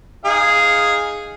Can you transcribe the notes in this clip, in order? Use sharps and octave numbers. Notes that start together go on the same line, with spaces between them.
D#4 G#4 F5